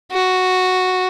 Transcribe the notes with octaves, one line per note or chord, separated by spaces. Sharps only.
F#4